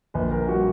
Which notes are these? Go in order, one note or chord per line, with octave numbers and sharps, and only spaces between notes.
A#1 B4
A#4
A#2 G3 F#4